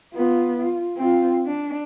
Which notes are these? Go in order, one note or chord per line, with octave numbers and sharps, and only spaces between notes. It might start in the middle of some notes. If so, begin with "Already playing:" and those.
B3 F4
F4
C4 F4
D4